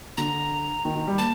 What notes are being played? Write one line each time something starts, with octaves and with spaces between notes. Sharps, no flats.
D3 A#5
D#3
D#3
G3
A#3 A5